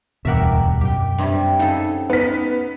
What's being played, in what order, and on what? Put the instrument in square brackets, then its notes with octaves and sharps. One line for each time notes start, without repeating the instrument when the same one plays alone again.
[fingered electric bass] D1 E2 G2 [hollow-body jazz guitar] B2 F#5 [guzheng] G4 A#4 E5
[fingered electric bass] F#2 [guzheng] G4 G5
[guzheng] G2 C3 G3
[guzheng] C#3 F#3 A4 [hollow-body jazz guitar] D#4
[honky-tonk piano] B3 B6 [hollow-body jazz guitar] D#4